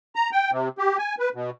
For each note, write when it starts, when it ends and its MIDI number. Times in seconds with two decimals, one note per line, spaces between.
0.16 0.30 82
0.32 0.51 79
0.51 0.69 48
0.78 0.97 67
0.98 1.15 80
1.19 1.29 71
1.34 1.50 47